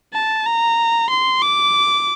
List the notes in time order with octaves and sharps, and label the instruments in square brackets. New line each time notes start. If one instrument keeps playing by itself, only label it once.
[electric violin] A5
A#5
C6
D6